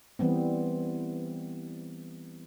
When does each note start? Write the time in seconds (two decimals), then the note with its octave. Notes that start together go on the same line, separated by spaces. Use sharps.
0.19 E3 G3 B3 C4